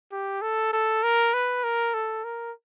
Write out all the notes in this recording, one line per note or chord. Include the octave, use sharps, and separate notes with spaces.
G4
A4
A4
A#4
B4
A#4
A4
A#4